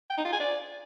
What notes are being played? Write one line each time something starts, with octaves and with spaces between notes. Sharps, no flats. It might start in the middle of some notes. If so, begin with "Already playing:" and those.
G5
D#4
F4
G#5
D5